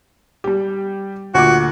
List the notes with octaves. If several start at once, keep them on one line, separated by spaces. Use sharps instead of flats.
G3 G4
D2 A#2 F#4 D6